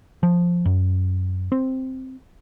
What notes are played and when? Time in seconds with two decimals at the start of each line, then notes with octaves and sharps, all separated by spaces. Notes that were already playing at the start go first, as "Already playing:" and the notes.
0.23 F3
0.66 F#2
1.52 C4